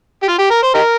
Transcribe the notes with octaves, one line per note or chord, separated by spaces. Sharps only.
G4
F4
G4
A#4
C5
D#4 G4 A#4